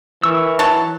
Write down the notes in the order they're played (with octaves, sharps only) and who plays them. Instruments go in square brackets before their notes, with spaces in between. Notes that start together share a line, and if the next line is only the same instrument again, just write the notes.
[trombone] E3 [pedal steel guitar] A#4 C#6 E6
[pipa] F#3 C#5 A5